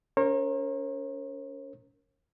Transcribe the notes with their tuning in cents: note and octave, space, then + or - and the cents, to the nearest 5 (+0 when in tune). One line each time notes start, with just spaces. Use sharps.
C#4 +30 A#4 +0 C#5 -45